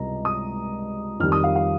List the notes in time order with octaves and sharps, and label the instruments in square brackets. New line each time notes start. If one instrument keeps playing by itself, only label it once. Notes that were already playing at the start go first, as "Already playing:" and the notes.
Already playing: [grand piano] C#2 C3 G3 D#5 A#5
D#6
F2 D#3 G3 F6
D#6
F5
F5